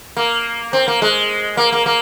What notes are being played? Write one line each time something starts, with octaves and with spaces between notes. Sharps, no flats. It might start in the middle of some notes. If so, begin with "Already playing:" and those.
A#3
C4
A#3
G#3
A#3
A#3
A#3